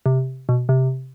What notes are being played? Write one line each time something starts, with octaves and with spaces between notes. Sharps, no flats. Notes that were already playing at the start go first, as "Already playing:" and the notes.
C3
B2
C3